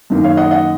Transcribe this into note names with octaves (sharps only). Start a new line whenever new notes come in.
F#2 D#3 A#3
C#5 F5
D#5 F#5
D#5 F#5